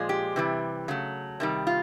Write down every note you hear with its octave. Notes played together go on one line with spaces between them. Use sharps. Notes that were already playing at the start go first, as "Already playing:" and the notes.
Already playing: A#2 F3 G#3
G4
C3 E3 G3
C#3 F#3 A3
C3 D#3 G3
F4